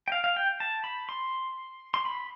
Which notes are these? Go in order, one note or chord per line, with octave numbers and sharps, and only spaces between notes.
G5
F5
F5
G5
A5
B5
C6
C6
B5